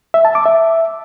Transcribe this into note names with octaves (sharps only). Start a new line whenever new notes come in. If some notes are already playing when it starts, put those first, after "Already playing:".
E5
A5
D6
E5